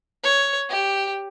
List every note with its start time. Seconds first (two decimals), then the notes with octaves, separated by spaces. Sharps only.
0.24 C#5
0.70 G4